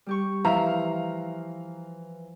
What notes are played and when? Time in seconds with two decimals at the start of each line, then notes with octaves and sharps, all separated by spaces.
0.06 G3 G4 C#6
0.45 E3 F3 E4 E5 F5 A#5